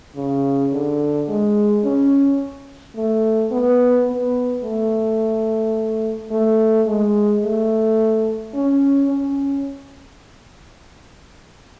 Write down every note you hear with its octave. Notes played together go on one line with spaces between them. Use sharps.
C#3
D3
G#3
C#4
A3
B3
B3
A3
A3
G#3
A3
C#4
C#4